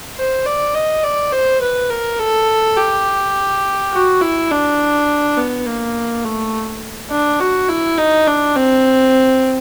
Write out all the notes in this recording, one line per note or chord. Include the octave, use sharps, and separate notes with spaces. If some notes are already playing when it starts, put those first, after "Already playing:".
C5
D5
D#5
D5
C5
B4
A#4
A4
G4
F#4
E4
D4
B3
A#3
A3
D4
F#4
E4
D#4
D4
C4